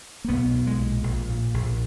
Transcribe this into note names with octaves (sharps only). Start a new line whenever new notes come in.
A#3
B1 B3
B1
G#3
A#2
A#1
A#2
A#1